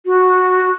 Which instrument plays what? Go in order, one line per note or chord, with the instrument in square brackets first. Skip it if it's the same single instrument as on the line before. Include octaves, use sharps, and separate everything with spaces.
[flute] F#4